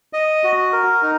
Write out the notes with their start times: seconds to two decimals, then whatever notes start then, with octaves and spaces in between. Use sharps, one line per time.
0.13 D#5
0.44 F#4
0.72 A#4
1.03 D#4